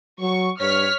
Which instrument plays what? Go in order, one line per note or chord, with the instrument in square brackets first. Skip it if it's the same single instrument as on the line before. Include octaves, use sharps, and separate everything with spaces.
[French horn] F#3 [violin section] C#6
[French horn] G2 [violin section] C#5 F6 B6